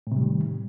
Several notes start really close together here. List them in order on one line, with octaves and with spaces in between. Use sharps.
A2 C3 G3 D#3